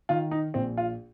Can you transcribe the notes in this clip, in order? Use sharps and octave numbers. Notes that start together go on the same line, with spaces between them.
D#3 F4
D#4
A#1 C4
F4